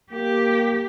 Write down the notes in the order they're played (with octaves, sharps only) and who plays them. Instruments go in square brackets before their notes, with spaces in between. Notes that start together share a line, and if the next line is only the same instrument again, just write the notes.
[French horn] A#3 [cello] G4